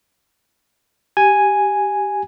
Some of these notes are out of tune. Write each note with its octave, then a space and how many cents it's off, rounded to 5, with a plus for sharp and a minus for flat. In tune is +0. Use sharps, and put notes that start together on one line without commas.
G4 -10 G#5 +0